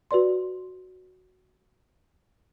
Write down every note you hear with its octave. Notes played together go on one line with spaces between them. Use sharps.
F#4 B4 D5 C6